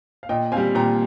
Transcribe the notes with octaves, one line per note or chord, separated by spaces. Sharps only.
F5
A#2 D#5 G5
G3 C4 F5 G#5
A#2 G5 A#5